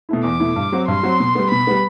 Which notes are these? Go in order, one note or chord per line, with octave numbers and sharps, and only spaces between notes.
B2 A3 E4
E2 D6
B2 A3 E4
G2
F#3 C4 F#4
G2 C6
F#3 C4 F#4
B2
G3 B3
B2 B5
G3 B3